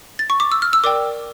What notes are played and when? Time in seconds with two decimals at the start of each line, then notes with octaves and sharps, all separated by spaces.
0.19 A6
0.30 C#6
0.40 D6
0.52 E6
0.62 F6
0.73 E6
0.84 A#4 D5 G5 D6